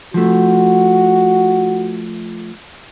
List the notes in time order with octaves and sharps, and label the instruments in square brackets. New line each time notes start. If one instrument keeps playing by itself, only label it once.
[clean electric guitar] F3 A3 [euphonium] F#4